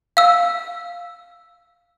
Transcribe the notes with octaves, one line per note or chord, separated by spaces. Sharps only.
F5 E6